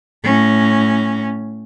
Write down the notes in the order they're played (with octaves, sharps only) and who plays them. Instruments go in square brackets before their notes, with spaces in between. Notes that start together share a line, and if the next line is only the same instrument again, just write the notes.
[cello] A2 C#4